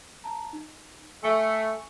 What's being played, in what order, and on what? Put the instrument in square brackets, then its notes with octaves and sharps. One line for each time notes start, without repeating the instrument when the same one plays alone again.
[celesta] A5 A#5
D#4
[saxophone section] A3 [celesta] G#5 C#6 C#7